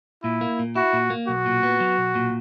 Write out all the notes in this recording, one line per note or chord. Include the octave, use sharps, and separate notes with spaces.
A#2 E4
A#3
A#2
E4 F#4
A#2
A#3
B1 F#4
A#2
B3
F#3
B1
A#2